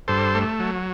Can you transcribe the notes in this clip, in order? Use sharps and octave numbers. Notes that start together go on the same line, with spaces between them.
G2 A4 C5
A3
F#3